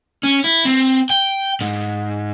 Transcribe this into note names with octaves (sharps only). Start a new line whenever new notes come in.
C#4
E4
C4
G5
G#2